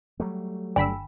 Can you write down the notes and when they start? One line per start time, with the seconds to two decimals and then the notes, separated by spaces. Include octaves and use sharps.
0.20 F#3 G3 A3
0.76 G1 D3 G5 G#5 B5 E6 B6